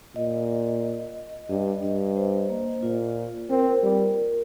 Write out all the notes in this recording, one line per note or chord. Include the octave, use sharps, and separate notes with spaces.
A#2 D#5
G2 D#5
G2 D#5
C5
A#3
A#2 F4
C4 A#4
G3